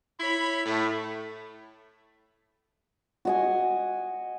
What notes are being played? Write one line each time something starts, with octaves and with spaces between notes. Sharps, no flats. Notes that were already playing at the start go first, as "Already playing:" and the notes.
E4 C#5 B5
A2 A3
F#4 D#5 G#5